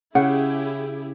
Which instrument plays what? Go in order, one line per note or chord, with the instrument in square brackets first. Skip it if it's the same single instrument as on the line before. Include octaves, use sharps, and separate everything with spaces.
[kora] C#3 [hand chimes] C#4 [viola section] E4 G4 G#4 [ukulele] F#5